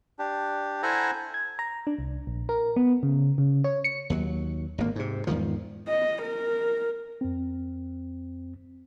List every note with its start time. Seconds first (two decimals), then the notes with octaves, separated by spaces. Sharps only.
0.19 D4 G4
0.83 E4 A4 C5 F#5 G#5 A#5
1.34 G#6
1.59 A#5
1.87 D4
1.99 C2
2.27 A#1
2.49 A#4
2.76 B3
3.03 C#3
3.38 C#3
3.64 C#5
3.84 C#7
4.10 D#2 F#3
4.78 G#1 D2 A#3
4.96 G#2 C3
5.27 E2 G#2 D#3 F3
5.88 D#5
6.22 A#4
7.21 F2 C4